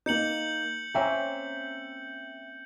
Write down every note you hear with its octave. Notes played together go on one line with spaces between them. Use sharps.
A#3 D#4 G6 C#7 F#7
A#3 C4 C#4 E5 G5 A#5